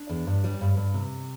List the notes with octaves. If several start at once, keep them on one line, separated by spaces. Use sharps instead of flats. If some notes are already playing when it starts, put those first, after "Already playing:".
Already playing: D4
E2
G2
G3
G2
G2
C3